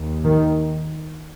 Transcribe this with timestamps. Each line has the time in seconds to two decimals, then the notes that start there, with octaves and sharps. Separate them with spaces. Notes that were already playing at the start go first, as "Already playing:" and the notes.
Already playing: D#2
0.23 D#3